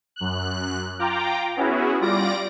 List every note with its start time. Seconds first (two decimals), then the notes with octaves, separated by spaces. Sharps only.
0.16 F#2 F#6
0.99 F4 G5 A#5 D6
1.56 B3 C#4 E4 F#4 G#4
2.01 G3 F4 D5 A#6 D7